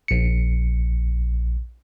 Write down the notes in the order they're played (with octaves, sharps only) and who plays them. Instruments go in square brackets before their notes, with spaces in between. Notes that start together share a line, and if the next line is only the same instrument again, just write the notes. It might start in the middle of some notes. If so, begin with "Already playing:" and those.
[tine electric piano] A#1 C#7